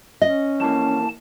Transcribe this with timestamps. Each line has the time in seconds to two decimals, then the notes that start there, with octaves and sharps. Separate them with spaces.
0.21 C#4 D#5
0.60 F2 E3 A#3 A5